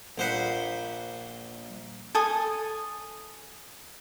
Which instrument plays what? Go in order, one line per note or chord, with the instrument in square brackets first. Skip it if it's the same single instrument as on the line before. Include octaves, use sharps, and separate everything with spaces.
[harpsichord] A#1 C5 F#5 B5
[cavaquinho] A4 G#5 D#6